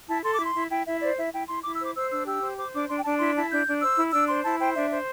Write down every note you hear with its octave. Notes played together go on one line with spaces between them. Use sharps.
E4 A5
A4 C6
D6
E4 C6
E4
E4 G5
E4 E5
C5 D5
E4 E5
E4 G5
E4 C6
E4 D6
E6
C5 D6
C5 E6
D4 E6
G4 E6
C5
C5 D6
D4 D6
D4 C6
G5
D4 A5
E4 C6
E4 A5
D4 G6
D4
C5 E6
E4
D4 E6
C5 C6
E4 A5
C5 G5
D4 E5
C5